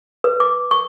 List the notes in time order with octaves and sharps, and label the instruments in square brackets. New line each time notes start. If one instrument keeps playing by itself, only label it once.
[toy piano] B4
D6
C#6